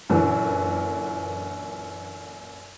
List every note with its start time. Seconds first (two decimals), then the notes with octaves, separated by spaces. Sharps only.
0.09 F#2 A#2 D3 E3